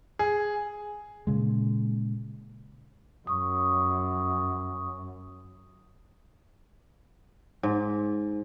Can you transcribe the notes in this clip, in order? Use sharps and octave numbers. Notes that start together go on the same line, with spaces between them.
G#4
A#2 C#3 G#3
F#2 C#6 D#6
G#2